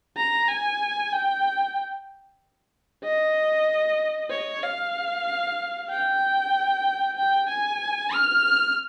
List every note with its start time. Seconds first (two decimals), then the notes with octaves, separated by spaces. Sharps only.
0.18 A#5
0.48 G#5
1.13 G5
3.04 D#5
4.30 C#5
4.63 F5
5.91 G5
7.17 G5
7.49 G#5
8.13 F6